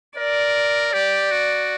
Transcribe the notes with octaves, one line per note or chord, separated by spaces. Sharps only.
A#4 D5
G4 D5
F#4